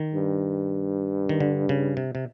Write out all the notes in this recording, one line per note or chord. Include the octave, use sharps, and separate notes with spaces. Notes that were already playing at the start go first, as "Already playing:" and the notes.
Already playing: D#3
G2
D#3
D3
C#3
C3
C3